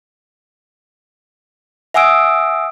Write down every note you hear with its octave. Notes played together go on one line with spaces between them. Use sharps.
E5 F#5 G#5 D#6 E6 D7